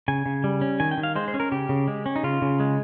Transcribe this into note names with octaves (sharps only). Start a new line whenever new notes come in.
C#3 G#5
C#3
G3
C#4
D#3 G#5
G5
D#3
F5
G#3 C5
C5
C#4
A#4
C#3 G4
C#3
G#3
C#4
D#4
C#3 F4
C#3
G#3